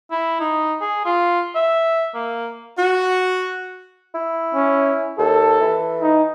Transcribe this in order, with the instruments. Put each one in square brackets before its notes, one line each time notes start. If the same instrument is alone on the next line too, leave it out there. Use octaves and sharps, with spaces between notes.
[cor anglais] E4
D#4
G#4
F4
E5
A#3
[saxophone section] F#4
[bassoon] E4
[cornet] C#4
[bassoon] D#2 [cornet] A4
[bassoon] E3
[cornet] D#4